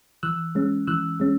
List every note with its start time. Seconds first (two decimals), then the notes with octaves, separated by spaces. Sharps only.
0.23 E3 E6 F#6
0.55 G#3 C#4
0.87 E3 E6 F#6
1.20 G#3 C#4